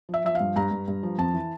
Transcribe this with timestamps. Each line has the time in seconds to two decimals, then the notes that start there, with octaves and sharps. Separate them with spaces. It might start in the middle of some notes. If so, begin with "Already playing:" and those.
0.09 F3 E5
0.25 F3 E5
0.35 F5
0.40 G2
0.56 G2 A#5
0.71 G2
0.88 G2
1.03 F3
1.18 F2 A5
1.34 E3